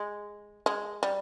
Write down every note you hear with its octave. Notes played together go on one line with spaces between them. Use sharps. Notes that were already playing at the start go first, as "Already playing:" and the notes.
Already playing: G#3
G#3
G3